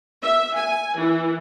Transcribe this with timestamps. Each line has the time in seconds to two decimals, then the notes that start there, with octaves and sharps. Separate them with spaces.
0.23 E5
0.56 G#5
0.97 E3